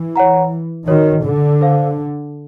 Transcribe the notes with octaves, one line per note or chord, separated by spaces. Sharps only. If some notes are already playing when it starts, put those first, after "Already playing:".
Already playing: E3
C#5 F#5 A#5
D#3 F#4 A#4 C#5
D3
A4 C5 F5